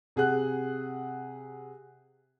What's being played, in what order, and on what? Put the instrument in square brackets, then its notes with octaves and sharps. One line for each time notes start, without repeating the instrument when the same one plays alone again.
[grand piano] C3 G#4 F#5 F#6